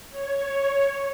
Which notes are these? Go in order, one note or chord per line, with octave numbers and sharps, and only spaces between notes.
C#5